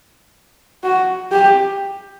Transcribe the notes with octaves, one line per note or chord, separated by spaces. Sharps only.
F#4
G4